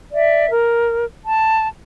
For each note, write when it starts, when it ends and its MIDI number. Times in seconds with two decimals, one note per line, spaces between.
0.13 0.49 74
0.13 0.49 76
0.52 1.05 70
1.26 1.67 81